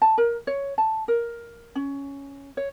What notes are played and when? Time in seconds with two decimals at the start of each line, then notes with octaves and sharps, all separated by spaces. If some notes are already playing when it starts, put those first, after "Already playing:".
0.02 A5
0.18 A#4
0.47 C#5
0.78 A5
1.08 A#4
1.75 C#4
2.57 C#5